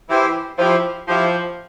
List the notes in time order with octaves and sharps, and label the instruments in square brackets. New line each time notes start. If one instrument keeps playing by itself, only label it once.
[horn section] E3 [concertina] E4 G4 C5
[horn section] F3 [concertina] E4 G4 C5
[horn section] F3 [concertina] E4 G4 C5